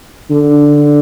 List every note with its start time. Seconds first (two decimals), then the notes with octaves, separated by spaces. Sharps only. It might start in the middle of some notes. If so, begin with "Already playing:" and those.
0.30 D3